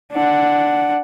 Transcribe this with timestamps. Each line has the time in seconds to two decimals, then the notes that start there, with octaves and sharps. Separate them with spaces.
0.13 D4 F#5